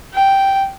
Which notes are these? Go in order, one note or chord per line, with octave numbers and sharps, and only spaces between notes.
G5